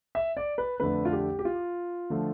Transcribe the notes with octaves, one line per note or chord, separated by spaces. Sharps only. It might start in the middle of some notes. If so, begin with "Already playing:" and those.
E5
D5
B4
F2 D3 A3 D4 B4
F4
G4
G4
F4
D3 F3 A3